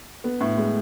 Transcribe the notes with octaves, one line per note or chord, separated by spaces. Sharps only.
B3
A2
G#3